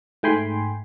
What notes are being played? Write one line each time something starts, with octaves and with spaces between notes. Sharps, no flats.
G#2 A3 G5 G#5 B5 C6